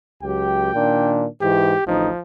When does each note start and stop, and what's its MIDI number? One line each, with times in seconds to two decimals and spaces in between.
0.22 0.72 37
0.22 0.72 54
0.22 0.72 67
0.22 1.14 79
0.74 1.25 46
0.74 1.25 51
0.74 1.25 62
1.41 1.73 44
1.41 1.73 52
1.41 1.84 67
1.87 2.09 33
1.87 2.09 38
1.87 2.21 53
1.87 2.09 63